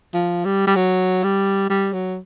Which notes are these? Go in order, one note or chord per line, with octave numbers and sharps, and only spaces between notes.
F3
G3
G3
F#3
G3
G3
F#3